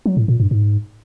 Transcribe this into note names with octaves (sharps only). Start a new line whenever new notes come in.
F#3
A2
A#2
G2
G#2